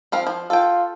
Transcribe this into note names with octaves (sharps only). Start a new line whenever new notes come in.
F3 C4 F5
F3
F4 A4 G5